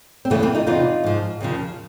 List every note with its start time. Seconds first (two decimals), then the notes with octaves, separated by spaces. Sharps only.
0.25 C4
0.30 D2 C#3 E3 A3 B3
0.42 A#3 C4
0.55 D#4 F4
0.67 E2 C3 E3 D#4 F4
1.04 G#2 F3
1.41 D#2 C#3 F3